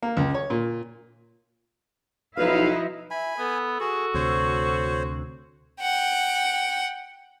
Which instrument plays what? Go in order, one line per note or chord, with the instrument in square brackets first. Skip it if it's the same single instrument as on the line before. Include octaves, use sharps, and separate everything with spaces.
[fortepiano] A#3
C#2
C#5
A#2
[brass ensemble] B1 F5 [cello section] F3 D#4 E4 [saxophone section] B4
[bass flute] E5 [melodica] G#5 B5
[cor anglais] B3 [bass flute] A4
[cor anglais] F#4 [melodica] G#4
[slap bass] D2 C3 [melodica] C5 C#5
[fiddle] F#5 G5